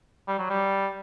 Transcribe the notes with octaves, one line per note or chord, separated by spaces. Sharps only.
G3
F#3
G3